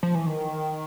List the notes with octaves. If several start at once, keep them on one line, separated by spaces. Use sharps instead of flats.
F3
E3
D#3